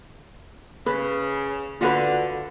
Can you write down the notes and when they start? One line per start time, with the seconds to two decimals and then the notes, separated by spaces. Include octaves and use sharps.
0.86 C#3 B4
1.81 D3 F4 F#4 B4